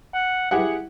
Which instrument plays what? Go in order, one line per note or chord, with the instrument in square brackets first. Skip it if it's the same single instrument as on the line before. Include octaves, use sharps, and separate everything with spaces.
[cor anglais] F#5
[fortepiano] E4 G4 F#5 [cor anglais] G#4